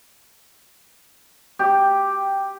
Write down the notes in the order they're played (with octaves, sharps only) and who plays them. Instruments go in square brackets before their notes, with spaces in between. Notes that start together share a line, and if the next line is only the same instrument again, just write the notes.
[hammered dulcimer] G4